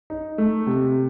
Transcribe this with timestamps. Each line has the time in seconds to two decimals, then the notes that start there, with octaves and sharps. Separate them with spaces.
0.10 D#4
0.38 A3
0.67 C3